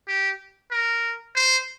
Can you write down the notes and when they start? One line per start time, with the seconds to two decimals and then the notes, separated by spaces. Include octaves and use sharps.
0.08 G4
0.71 A#4
1.35 C5